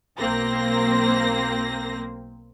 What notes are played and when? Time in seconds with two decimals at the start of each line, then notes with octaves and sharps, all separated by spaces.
0.18 B1 A#3 C4 A#6